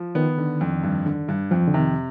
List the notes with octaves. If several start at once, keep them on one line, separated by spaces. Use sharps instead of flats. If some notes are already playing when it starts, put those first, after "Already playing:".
Already playing: F3
D#3 B3
D3
F2
G2
D3
G2
F2 F3
D3
C3 D#3